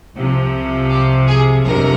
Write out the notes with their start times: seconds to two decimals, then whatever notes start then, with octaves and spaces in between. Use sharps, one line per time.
0.14 C2 C3 F3
0.90 G4
1.27 G#4
1.65 G1 F2 C3 F3 A#4